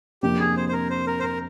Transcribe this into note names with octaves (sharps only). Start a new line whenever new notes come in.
F2 C3 F3 A#3 D4 G4
G#4
C5
C5
A#4
C5
A#4
C5
A#4